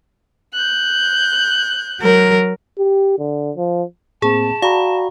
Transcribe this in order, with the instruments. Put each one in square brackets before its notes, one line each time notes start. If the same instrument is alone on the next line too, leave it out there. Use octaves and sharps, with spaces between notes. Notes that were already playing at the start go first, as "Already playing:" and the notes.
[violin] F#6 G6
[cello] F#3 A#4
[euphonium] G4
D3
F3
[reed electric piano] A2 A#3 C4 [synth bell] G#4 [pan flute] A5
[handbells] F#4 A#5 [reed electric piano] D5 G5 B5 [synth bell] F5